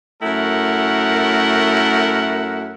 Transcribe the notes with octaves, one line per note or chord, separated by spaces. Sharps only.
F#2 A3 E4 A#4 F#5